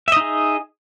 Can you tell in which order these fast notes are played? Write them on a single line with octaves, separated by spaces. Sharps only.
E5 D#5 D#4 G#4